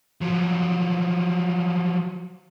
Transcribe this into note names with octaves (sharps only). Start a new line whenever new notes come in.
F3 F#3